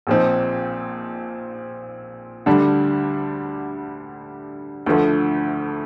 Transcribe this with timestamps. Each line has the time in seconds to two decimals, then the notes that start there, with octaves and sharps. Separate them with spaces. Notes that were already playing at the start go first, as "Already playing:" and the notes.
0.07 A#1 A#2 F3 C4 D#4
2.46 D2 D3 G3 D4
4.86 D2 D3 F3 A3